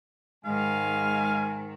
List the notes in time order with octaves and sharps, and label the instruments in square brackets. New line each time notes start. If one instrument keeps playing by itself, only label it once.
[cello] G#2 D#3 [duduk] G#3 [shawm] F5 [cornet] G#5